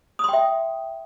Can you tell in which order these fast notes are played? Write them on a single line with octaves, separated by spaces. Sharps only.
D#6 C6 G5 E5